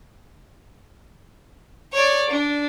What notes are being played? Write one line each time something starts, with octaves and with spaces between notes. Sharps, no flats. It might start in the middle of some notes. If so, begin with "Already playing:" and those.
C#5 D5
D4